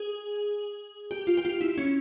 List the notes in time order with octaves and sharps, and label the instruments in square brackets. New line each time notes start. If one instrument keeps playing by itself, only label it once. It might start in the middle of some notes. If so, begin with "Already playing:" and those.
Already playing: [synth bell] G#4
G4
F4
G4
F4
E4
C#4